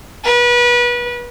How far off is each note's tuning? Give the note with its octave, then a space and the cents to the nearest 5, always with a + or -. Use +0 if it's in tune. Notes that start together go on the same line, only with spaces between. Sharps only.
B4 -30